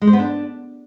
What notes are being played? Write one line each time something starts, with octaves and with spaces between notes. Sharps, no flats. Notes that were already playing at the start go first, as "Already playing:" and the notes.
G#3
C5
B3
D4